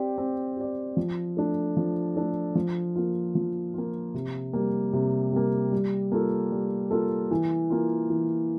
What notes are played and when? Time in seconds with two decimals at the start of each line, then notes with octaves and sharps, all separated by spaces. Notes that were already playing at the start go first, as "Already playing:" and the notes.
Already playing: C4 G4 D5
0.18 C4
0.57 G4 D5
0.97 F3
1.37 A3 D4 A4
1.77 F3
2.16 A3 D4 A4
2.55 F3
2.96 A#3 F4
3.35 F3
3.74 A#3 F4
4.14 C3
4.53 G3 A#3
4.93 C3
5.33 G3 A#3
5.72 G3
6.12 A#3 F4 A4
6.52 G3
6.91 A#3 F4 A4
7.31 E3
7.70 A#3 F4
8.10 E3